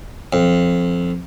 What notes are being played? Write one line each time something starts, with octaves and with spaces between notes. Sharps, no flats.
F2